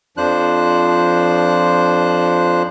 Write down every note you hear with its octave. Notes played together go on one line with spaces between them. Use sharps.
F2 F3 D4 C5 F#6